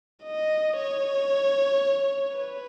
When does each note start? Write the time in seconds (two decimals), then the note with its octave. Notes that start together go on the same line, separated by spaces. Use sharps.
0.24 D#5
0.77 C#5
2.37 B4